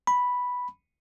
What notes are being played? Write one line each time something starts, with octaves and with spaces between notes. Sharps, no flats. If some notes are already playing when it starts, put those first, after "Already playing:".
B5